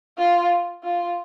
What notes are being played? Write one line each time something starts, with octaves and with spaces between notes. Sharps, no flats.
F4
F4